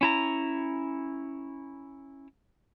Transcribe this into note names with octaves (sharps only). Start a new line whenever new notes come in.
C#4 E4 A#5